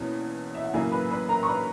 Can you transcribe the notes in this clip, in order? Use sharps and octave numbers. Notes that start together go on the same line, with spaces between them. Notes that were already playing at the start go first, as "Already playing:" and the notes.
Already playing: E2 B2 A#3 C#4 E4
E5
F#5
F#2 C#3 E3 A#3 G#4 G#5
B4 B5
B4 B5
A#4 A#5
C#6
B4 B5